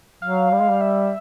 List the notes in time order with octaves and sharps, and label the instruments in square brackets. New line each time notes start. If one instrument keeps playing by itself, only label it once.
[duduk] F#3 [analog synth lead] F5
[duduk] G3
G#3
G3
[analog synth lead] E5